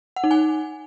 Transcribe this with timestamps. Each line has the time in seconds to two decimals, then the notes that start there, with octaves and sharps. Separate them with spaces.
0.16 F#5
0.24 D#4
0.31 G#5